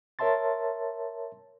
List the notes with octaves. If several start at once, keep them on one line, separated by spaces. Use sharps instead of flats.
A#4 C#5 E5 A5 C6 A6